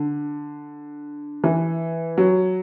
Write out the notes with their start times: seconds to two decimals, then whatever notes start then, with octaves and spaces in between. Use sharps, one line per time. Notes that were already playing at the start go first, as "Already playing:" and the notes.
Already playing: D3
1.44 E3
2.18 F#3